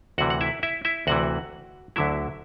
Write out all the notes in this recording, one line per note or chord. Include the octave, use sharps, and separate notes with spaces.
D2 C3 E3 F#4 F#5
F#5
E4 E5
E4 E5
E4 E5
D2 C3 E3 F#4 F#5
D2 D3 F#3 E4 E5